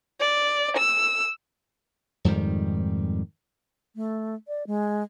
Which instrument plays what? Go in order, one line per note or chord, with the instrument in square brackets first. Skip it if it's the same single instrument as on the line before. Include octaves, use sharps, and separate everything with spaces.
[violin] D5
E6
[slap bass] F2 G#2 D#3 G3
[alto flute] A3
D5
G#3